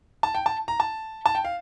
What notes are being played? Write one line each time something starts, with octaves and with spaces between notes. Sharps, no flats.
A5
G5
A5
A#5
A5
A5
G5
F5